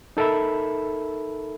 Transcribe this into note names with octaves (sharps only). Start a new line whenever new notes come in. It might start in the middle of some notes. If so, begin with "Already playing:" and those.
D#4 A4 A#4 E5 B5